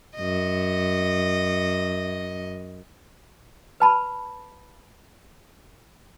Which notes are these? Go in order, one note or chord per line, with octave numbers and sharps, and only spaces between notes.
F#2 D#5
B4 A5 B5